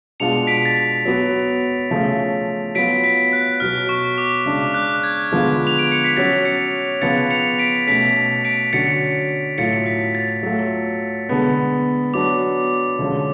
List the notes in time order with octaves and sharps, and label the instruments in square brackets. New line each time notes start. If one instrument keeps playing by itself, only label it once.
[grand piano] B2 G#3 D4 F4 [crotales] C#7 F7
[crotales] B6 D7
A6
B6
[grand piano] F#3 B3 F#4
C#3 F3 A3 C#4
[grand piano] F#3 B3 F4 [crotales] B6 D7
[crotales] B6 D7
F#6
[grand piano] B2 F#3 B3 F#4 [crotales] F6
[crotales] C#6
D6
[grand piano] C#3 G#3 D4
[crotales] F#6
G#6
[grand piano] D3 F3 G#3 B3 F4
[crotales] F7
D7
C#7
B6
[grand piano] F#3 C#4 F#4 [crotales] A6
[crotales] A6 C#7
[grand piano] C#3 F3 B3 [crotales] A6 C#7
[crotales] C#7 F7
B6 D7
[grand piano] B2 A3 C#4 [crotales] B6 D7
[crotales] B6 D7
[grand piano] D3 F#3 C#4 F#4 [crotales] A6 C#7
[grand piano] A2 F#3 A3 F4 [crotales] A6 C#7
[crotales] B6
A6
[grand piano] F#3 A3 F4
D3 G#3 B3
[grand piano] F#3 B3 D4 F#4 [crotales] D6
[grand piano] D3 F3 G#3 C#4